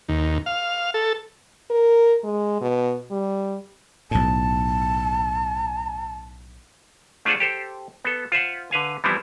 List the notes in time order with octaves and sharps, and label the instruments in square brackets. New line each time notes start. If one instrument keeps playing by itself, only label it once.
[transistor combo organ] D#2
F5
A4
[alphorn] A#4
G#3
B2
G3
[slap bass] B1 A2 [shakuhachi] A5
[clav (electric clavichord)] A3 D4 F4 G#4 C5 F#5
G4 A4 C5
B3 A4
F4 C5 E5 F#5
D3 B4 F5 G#5
E3 F3 G3 B3 C4 E4